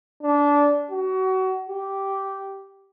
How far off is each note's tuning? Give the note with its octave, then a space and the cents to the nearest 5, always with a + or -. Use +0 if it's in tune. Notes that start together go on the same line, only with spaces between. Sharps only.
D4 -20
F#4 +30
G4 -10